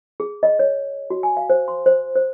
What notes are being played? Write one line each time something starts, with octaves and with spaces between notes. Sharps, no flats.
G#4
D#5
C#5
F#4
G#5
F5
C5
C6
C5
C5